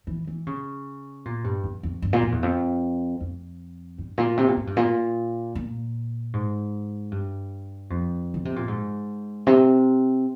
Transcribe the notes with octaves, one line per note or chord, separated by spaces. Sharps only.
E3
E3
C#3
A#2
G2
F2
F2
G2
A#2
F2
E2
F2
F2
G2
A#2
C3
A#2
G#2
G2
A#2
A#2
G#2
G2
F2
C#3
C3
A#2
G#2
C3